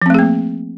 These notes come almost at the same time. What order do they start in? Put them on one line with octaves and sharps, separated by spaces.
F3 C4 A3 G#4 A#3